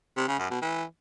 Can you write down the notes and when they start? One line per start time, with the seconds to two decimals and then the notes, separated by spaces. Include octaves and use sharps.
0.16 C3
0.28 C#3
0.39 F#2
0.50 B2
0.61 E3